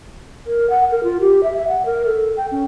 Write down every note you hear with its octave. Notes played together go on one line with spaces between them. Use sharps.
A#4
F#5
A#4
F4
G4
E5
E5
F#5
A#4
A4
G5
C#4